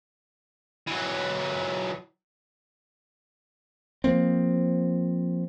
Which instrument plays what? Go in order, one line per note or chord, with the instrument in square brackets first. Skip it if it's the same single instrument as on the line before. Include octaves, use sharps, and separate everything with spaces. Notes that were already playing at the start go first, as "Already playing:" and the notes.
[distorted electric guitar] E3 F#3
[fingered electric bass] F3 A#3 C4